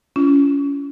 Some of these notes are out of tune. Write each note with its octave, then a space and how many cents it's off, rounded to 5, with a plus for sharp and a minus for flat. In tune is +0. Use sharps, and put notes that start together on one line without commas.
C#4 +25 F4 -30